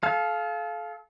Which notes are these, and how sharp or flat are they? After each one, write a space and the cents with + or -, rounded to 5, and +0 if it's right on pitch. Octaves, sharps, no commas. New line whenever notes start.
A4 -35 F5 +0